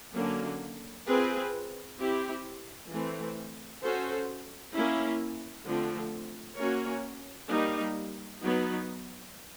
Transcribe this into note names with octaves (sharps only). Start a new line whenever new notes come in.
D3 F#3 A#3 C#4
C4 F4 G#4 B4
C4 E4 G4
E3 A3 C4
C#4 F#4 A4 C5
A#3 C#4 E4
D3 F3 A3 C4
A#3 C#4 F#4 A#4 C#5
G3 A#3 D#4
F#3 B3 D#4